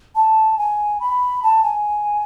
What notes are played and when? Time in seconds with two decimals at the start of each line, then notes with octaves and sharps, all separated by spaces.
0.15 A5
0.58 G#5
1.00 B5
1.43 A5
1.63 G#5